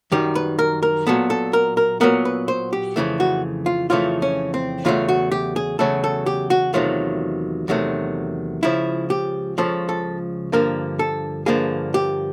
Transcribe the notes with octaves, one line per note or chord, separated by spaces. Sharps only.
F#2 D#3 G3 G4
B4
A#4
A#4
A#2 F#3 B3 A4
A4
A#4
A#4
A#2 F#3 B3 A#4
B4
C5
G4
F2 C#3 E3 A3
F#4
F4
F2 C#3 E3 A3 F4
C#4
C4
E2 C#3 F#3 A3 F4
F#4
G4
G#4
E2 C#3 F#3 A3 A4
A4
G4
F#4
E2 C3 D#3 F#3 A3 F4
E2 C3 D#3 F#3 A3
C#2 C#3 F3 E4
G4
C#2 C#3 F3 A4
A4
G2 D3 F3 A#3 A#4
A4
G2 D3 F3 A#3 G#4
G4